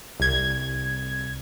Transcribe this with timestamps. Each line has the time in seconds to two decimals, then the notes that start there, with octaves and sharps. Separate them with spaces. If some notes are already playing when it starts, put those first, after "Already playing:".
0.20 C2 G#6